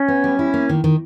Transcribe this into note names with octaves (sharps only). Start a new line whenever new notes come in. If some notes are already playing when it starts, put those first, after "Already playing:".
Already playing: C#4
B3
G3
E4
A#3
D#3
D#3